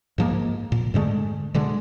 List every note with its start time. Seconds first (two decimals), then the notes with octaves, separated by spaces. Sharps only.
0.18 G#2 F3 A#3
0.72 A#2
0.94 G#2 D3 G#3 A3
1.54 B2 D3 G#3